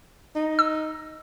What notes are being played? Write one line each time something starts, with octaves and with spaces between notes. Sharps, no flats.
D#4
E6